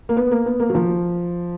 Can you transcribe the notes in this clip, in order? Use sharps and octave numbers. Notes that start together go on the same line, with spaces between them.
A#3
B3
A#3
B3
A#3
F#3
F3